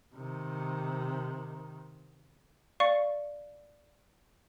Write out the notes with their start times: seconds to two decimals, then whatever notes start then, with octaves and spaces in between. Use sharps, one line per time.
0.15 C3 D#3
2.80 D5 F5 C#6 C#7